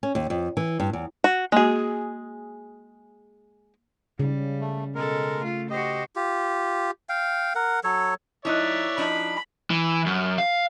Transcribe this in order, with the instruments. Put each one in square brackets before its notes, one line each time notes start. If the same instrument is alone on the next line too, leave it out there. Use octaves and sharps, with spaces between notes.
[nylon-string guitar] C#4
D#2
F2
E3
G2
E2
[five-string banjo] F#4
[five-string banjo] G#3 G#4 [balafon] A#3 F#4
[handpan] C#3 [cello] G3
[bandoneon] A3
[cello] B2 A4 [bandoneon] G#3 A#4
[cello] A3 F4
[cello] F#4 C5 [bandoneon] G4 D#5
[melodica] F4 G4
F5 G5
A#4 F#5
F#3 A4 C#5
[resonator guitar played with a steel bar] F3 D#4 [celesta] E4 F#6 [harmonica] C#5 D5 E5
[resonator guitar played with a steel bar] F3 D4 D#4 [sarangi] B5
[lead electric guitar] E3
F#2
F5